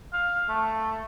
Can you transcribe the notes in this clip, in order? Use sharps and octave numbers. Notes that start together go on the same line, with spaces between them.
F5
A3